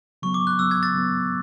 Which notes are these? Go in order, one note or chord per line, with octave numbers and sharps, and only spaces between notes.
C#3 F#3 B3 C#6
D6
F#6
C#3 F#3 B3 E6
G#6
A6
C#3 F#3 B3